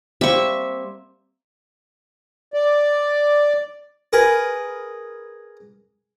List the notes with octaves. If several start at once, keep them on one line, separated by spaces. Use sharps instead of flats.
G3 A#3 C4 E5 C#6
D5
G#4 A#4 B4